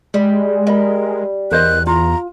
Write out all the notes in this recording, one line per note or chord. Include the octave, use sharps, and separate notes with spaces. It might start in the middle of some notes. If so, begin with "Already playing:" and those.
G3 G#3
G3 A#4 D#5 B5
E2 A#4 C5 D#5 F#6
F4 A#5